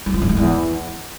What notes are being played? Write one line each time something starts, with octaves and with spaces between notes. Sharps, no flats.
G3
F3
G#2
G#3
E2